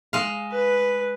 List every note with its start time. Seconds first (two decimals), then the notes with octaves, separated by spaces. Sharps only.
0.13 G#3 F5
0.51 B4